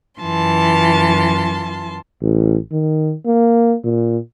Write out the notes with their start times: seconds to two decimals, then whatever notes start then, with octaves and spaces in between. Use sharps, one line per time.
0.20 F#2 E3 F4 A5 C6
2.22 A1
2.72 D#3
3.26 A#3
3.84 A#2